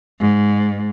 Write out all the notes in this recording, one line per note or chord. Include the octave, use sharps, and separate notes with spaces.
G#2